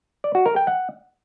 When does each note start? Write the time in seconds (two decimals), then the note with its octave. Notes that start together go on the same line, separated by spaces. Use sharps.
0.24 D5
0.35 F#4
0.46 A#4
0.56 G5
0.67 F#5